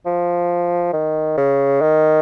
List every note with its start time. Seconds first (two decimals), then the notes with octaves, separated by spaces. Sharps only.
0.06 F3
0.93 D#3
1.37 C#3
1.81 D#3